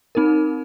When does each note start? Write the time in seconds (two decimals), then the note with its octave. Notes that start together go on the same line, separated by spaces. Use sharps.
0.15 C4 D#4 A#4